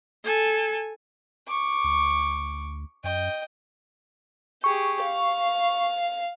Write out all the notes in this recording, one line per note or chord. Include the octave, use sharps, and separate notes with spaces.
A4 G#5
C#6 D6
D2
F#2 D#5 G5
G4 G#4 C#6
F5